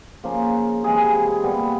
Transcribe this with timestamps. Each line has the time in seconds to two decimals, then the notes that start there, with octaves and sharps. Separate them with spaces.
0.24 C#3 F3 A#3
0.84 C3 E3 G#3 G#4
1.43 A#2 G3 B3